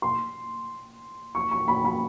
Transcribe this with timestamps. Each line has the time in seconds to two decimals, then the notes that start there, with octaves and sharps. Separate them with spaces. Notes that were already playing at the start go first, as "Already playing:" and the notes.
0.02 C6
1.35 C#6
1.51 C#6
1.68 B5
1.85 B5